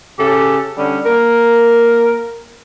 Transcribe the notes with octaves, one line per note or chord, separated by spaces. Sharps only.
C#3 G4 A4
D3 G3 C#4
A#3 A#4